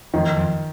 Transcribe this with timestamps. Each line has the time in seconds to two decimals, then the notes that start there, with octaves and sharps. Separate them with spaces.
0.14 F2 D#3
0.37 F2